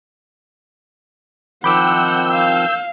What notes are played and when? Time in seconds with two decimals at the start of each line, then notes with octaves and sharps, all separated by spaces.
1.64 D#3 F3 C4 F#5 B5 D6 E6 G6
2.32 F5